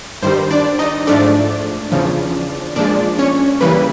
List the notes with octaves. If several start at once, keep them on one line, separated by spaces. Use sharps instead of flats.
G2 D#3 G3 C5
D4 D5
D#4 D#5
G#2 F3 A3 D4 D5
E2 C#3 F3
A#2 F3 G#3 D4 D5
C#4 C#5
C#3 E3 G3 A#3 B4